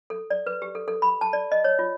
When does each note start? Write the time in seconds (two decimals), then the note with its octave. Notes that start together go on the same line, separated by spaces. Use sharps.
0.10 A4
0.30 D5
0.47 B4
0.62 G4
0.75 A4
0.88 A4
1.02 B5
1.21 A5
1.33 D5
1.52 D#5
1.64 C#5
1.79 F4